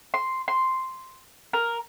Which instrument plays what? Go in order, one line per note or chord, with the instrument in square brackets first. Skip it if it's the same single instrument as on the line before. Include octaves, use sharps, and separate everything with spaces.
[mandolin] C6
C6
A#4